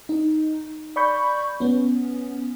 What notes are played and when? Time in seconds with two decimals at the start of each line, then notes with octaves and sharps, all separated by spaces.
0.09 D#4
0.96 D5 B5 C#6 G6
1.60 B3 C#4